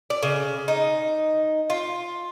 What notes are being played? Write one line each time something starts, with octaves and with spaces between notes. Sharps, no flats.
D5
C#3
D#4
F4